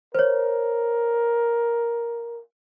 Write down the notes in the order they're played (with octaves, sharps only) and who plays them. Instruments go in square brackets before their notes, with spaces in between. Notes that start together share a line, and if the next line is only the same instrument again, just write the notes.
[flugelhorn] A#4 [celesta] C5 C#5